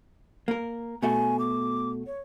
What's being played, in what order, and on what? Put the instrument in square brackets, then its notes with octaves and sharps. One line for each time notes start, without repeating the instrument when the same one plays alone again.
[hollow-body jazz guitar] A#3 A#4
[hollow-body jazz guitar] B2 A3 F#4 [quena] G#5
[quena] D6
C#5